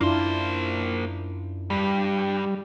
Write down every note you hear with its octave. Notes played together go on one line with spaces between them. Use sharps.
F#2 A#3 D4 E4 F4 C5
G2 G3